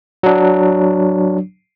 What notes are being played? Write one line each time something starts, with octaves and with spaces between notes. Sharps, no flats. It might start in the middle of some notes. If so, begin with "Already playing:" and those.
F#3 D4